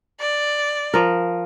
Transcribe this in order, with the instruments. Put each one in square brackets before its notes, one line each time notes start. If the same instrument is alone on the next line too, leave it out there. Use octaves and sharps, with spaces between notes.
[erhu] D5
[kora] F3 A#4